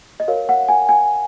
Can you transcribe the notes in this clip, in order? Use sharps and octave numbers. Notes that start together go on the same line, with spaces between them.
D#5
F#4 A#4 C#5 F5
F#5
G#5
G#5